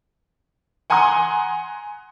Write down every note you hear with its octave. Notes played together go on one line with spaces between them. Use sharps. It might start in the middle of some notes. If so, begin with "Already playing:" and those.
F#5 G#5 A#5 C6 D#6